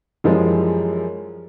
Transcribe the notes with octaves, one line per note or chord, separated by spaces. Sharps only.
F#2 E3 F3 G3 G#3